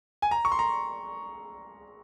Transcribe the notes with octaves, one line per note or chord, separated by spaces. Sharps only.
G#5
A#5
C#6
C6
A#5